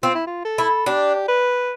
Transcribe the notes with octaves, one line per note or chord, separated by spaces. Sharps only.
C4 F4
E4
F4
A4
E4
D4 G4
B4